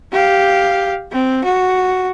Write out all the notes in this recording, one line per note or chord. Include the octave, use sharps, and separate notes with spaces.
G4 F5
C4
F#4